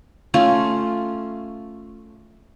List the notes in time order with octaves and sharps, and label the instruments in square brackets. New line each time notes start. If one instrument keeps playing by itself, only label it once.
[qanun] A3 C#4 F4